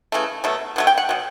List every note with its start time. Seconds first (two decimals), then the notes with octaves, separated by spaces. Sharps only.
0.12 C#3 E3 A3
0.44 B2 F#3 A3
0.76 B2 F#3 A3
0.87 G5
0.98 F#5
1.09 B2 F#3